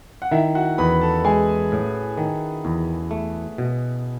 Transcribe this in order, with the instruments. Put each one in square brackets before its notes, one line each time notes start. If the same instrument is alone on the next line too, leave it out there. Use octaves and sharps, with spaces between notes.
[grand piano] F#5
[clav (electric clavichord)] D#3 [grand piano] E4 E5
[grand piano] F#4 F#5
[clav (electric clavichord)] E2 [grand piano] B4 B5
[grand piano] A4 A5
[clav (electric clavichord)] G#3 [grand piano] G#4 G#5
[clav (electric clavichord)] A2
D#3
E2
A3
B2